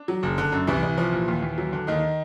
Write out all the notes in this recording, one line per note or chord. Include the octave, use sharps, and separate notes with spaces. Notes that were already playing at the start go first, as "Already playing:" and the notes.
Already playing: D4
F#3
F#1
D3
F#2
C2 E3 E4
C2
F3
A#2
D#2
D#2
F#3
D3
D#2 D#3 D#4